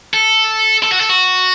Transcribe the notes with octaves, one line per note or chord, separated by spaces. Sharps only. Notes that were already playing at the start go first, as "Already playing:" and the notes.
A4
A4
F#4
A4
F#4